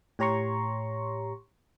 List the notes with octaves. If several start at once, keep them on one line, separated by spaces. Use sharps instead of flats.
A2 G4 C#5 A#5 C6 C#6